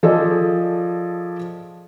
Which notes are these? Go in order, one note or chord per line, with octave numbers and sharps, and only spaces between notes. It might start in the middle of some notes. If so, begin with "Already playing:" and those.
F3 G#4 A4 D5 D#5